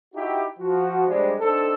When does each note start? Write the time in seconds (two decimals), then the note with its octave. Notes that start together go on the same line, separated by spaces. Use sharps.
0.14 D#4 E4 F#4 G4
0.59 F3 F#4
1.07 C3 F3 G3 G#3 C4 D4
1.40 C4 D4 D#4 A4